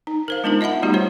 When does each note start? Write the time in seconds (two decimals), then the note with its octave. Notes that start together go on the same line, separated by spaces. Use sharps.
0.07 D#4
0.28 A#4 C5 F5
0.44 G#3 B3 D4 D#4 F4 A#4
0.61 F4 D#5 E5 F#5 B5
0.82 G3 A3 B3 D#4 F#4 G4
0.94 F4 C5 C#5